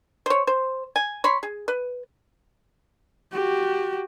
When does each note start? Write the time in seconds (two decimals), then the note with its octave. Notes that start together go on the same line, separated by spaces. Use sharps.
0.26 C5 C#5
0.47 C5
0.96 G#5
1.24 C#5 B5 C6
1.43 G#4
1.68 B4
3.33 F#4 G4